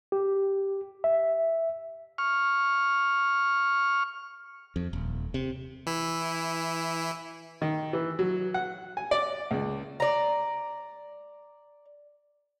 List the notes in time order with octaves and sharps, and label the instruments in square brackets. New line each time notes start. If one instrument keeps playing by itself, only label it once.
[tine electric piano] G4
E5
[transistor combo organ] C#6 F6
[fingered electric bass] F2
D#1
C3
[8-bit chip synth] E3 E4
[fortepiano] D#3
E3
F#3
F#5
G#5
D5
C#2
[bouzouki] D5 A#5